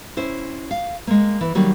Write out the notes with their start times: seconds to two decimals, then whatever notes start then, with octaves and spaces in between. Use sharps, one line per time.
0.17 C#4 E4 C5
0.71 F5
1.07 G#3 A#3
1.41 E3
1.55 D#3 F#3 G3 A#3